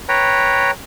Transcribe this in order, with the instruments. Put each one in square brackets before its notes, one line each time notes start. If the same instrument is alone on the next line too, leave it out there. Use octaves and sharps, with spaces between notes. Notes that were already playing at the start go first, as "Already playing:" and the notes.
[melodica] B4 C#5 G5 A#5